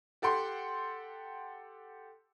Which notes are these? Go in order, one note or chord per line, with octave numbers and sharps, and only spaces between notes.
G4 A4 F#5 G5 C6